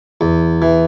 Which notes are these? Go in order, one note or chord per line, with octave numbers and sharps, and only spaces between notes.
E2
E3